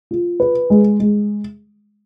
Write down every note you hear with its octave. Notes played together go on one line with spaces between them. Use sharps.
F4
B4
G#3
G#3